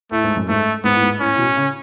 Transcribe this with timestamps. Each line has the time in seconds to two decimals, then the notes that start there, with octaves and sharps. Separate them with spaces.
0.11 A2 A3
0.24 G#2
0.37 F#2
0.48 G#2 A3
0.84 G#2 B3
0.94 A2
1.02 G#2
1.20 A2 C#4
1.34 A2
1.38 B2
1.57 C#3